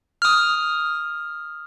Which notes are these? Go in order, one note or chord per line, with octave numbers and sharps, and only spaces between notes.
D#6 F6